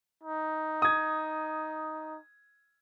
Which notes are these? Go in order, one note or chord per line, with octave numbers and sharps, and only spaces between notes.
D#4
D#6 G#6